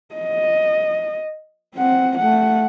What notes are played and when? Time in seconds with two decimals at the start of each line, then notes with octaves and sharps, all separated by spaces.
0.15 D#5
1.75 C4 F#5
2.18 A3 F#5